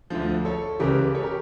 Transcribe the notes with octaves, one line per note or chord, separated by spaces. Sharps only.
D2 D3 F3
A4 C#5
C#2 C#3 E3 G4 A#4
A4 C#5
G4 A#4